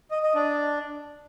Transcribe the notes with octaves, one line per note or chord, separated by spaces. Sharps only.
D#5
D#5
D4